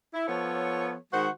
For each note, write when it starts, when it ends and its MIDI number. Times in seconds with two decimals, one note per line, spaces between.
0.14 0.25 64
0.28 0.96 53
0.28 0.96 59
0.28 0.96 69
0.28 0.96 73
1.13 1.29 51
1.13 1.29 56
1.13 1.29 66
1.13 1.29 72
1.13 1.29 78